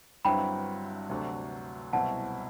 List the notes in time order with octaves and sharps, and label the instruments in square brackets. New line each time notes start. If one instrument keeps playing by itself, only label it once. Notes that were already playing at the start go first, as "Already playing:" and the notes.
[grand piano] G1 G2 F#3 C4 E4 [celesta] G5 B5
[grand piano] D2 C3 F#3 A3 D4
[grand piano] C2 B2 F#3 C4 E4 [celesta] F#5 A5